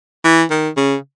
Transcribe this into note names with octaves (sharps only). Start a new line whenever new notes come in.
E3
D#3
C#3